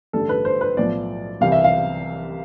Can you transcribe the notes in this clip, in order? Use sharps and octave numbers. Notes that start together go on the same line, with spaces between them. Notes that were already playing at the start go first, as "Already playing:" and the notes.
A1 G2 D3 A3 A4
B4
C5
B4
B1 A2 F3 D5
C2 C3 E3 F5
E5
F5